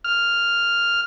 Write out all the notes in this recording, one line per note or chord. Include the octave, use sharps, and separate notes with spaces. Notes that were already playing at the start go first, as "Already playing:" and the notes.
F6